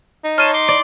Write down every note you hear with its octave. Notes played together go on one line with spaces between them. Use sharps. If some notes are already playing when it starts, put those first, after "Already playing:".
D#4
C#5 A5 C6 F6 D#7 E7
C6 D6
D5